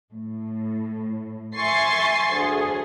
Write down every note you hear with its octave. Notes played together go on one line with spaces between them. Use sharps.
A2
E5 G#5 C6 C#6 A6 C7
D2 G#4